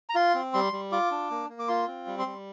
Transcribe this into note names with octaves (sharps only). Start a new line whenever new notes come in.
A#5
F4 C6
C4
G3 C6
G3
F4 D6
D4
A#3
A#3
D6
F4 C6
C4
G3
C6
G3